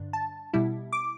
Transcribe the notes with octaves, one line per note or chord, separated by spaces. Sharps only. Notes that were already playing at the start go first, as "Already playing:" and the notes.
Already playing: G2 D3 D4
A5
B2 G3 E4
D6